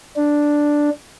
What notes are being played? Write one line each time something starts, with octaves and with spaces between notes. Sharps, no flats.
D4